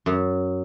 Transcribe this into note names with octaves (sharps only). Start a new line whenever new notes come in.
F#2